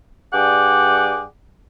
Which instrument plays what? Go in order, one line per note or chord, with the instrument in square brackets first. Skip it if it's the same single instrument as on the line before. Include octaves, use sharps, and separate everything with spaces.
[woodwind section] G2 G#4 D5 F#5 G5 D6